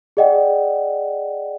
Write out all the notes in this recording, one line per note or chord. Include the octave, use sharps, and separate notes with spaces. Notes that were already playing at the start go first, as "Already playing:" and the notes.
G#4 D5 D#5 F#5 G5